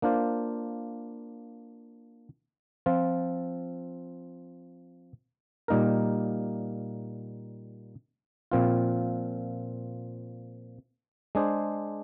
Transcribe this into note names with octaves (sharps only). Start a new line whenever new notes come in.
A#3 D4 F4 C5
F3 C4 F4
A#2 G3 A#3 D#4 A#4
A#2 F3 C4 F4
G#3 D4 G#4 C5